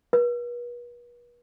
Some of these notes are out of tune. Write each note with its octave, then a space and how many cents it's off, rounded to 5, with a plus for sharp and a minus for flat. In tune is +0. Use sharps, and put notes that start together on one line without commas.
B4 -40